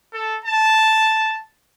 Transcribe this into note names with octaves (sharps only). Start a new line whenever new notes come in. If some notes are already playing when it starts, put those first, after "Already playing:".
A4
A5